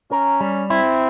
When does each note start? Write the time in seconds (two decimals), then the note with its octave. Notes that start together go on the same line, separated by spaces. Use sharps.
0.11 C#4 A#4
0.40 G3
0.70 C4 E4